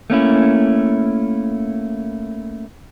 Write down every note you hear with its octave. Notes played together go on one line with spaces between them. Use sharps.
A3 A#3 C#4 E4